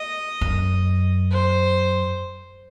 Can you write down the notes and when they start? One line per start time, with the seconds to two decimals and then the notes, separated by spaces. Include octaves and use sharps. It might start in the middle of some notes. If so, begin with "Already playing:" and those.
Already playing: D#5
0.41 F#2
1.31 C5